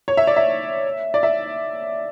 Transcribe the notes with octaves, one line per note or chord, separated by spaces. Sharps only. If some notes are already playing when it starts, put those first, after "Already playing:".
C#5
E5
D5
E5
D5
E5